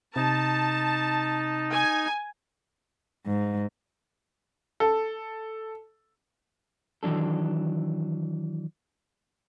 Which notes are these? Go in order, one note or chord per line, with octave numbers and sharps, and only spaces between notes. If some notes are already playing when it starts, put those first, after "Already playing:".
C3 D#4 A5
G#5
G#2
A4
D#3 E3 F#3 D4 A4